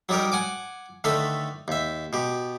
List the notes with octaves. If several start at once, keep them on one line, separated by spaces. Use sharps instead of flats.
F#3 G3 D#4 G4 A#4
F#5 G#5 D6
D3 D#3 A3 A4 B4
D#2 E5
B2 G4